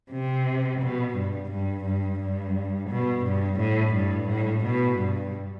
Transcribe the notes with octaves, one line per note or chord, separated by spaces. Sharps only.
C3
B2
G2
G2
G2
G2
B2
G2
A2
G2
A2
B2
G2